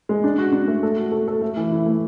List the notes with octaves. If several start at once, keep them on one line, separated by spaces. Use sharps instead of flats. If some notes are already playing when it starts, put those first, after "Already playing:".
G#3
D4
F#4
D4
A3
A4
F#4
A4
A4
A3
E3
E4
A3